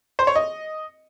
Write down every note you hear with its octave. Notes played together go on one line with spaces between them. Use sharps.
C5
C#5
D#5